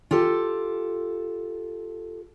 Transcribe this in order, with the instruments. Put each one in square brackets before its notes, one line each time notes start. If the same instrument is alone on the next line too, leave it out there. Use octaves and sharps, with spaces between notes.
[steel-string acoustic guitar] F4 G4 A4